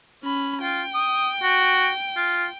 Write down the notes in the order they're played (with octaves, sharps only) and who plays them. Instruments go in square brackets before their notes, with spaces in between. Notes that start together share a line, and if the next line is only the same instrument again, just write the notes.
[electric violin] C#4 B5
[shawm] F4 [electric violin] G5
[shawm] D#6
F#4
F4